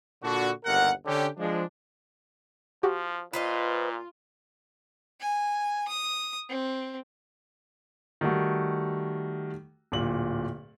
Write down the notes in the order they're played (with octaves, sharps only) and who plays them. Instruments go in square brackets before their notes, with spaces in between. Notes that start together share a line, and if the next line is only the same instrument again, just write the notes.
[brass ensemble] A#2 D3 D4 F#4
G1 D#2 A#4 F#5
D3 C#4 G4
F3 G#3 D4
[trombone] F3 [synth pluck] F#4 G4
[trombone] A#2 [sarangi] F4 [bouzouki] B4 C5 D#5
[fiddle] G#5
D#6
C4
[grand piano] D#3 G3 A3 F#4
D1 A#2 F#7